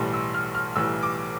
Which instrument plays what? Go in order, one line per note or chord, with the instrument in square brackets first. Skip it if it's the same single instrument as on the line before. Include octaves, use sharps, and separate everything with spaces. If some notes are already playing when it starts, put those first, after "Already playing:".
Already playing: [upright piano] B1 A2 E3 G3 C6
E6
F6
F6
B1 A2 E3 G3 E6
D6